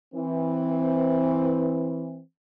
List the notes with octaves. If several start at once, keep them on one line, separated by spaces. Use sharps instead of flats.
E3 C4